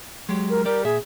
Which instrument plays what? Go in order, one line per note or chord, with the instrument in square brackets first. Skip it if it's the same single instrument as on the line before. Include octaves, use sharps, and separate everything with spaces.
[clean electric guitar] F#3 G#3 G4
[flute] A#4
[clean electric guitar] G3 G4 D5 [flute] A#4
[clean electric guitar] A#2 E5 [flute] G#4